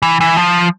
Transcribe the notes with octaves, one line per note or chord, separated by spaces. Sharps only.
E3
E3
F3